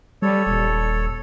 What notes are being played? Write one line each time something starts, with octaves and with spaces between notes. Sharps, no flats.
G3 A4 C#5
D#1